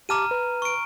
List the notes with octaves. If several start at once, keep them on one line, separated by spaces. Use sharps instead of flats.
G4 A5 A#5 D6 F6 D#7
B4
C#6 D7